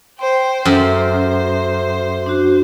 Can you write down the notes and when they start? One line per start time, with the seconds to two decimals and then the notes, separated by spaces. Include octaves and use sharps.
0.19 C5 G5 C6
0.65 F#2 A4 C5 E5
2.26 D4 F#4